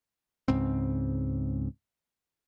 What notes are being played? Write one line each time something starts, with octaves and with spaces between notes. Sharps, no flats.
C#2 G#2 C#3 C4